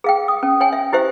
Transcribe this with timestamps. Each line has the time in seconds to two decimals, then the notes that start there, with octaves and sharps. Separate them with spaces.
0.04 G#4 F5 G5
0.28 D#6
0.43 C#4
0.60 C#5 F5 G5 G#5
0.73 E5
0.93 E4 G4 C5 E5